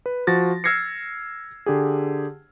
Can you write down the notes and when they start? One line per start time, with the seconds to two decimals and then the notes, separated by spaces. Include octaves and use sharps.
0.06 B4
0.27 F3 F#4 A6 A#6
0.64 E6 F6 G#6 A#6 C7 C#7
1.66 D3 G4 G#4